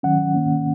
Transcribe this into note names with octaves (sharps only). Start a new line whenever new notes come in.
D#3 F#3 C#4 F#5
D#3 A#3 C#4